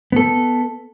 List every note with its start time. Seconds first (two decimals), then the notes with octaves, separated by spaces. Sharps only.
0.12 B3 A4